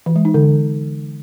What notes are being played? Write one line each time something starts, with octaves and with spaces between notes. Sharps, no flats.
E3
G#3
D#4
D3